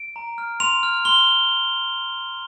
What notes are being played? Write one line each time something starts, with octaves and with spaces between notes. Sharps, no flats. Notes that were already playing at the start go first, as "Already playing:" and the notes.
Already playing: D7
A#5
F6
C6 F7
F6
C6 G7